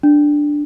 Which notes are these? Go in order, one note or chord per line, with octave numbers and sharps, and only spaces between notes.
D4